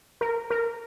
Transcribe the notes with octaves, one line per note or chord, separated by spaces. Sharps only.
A#4
A#4